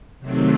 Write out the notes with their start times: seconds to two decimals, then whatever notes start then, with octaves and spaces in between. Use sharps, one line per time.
0.20 C3 D#3 F#3 A3 C4